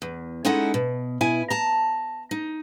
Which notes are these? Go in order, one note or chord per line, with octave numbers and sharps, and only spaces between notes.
E2
G#3 C#4 D#4 E4 A4 F#5
B2
B2 E4 G#5
A5 A#5
D#4